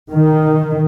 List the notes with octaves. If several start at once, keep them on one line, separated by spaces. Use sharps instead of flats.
D#3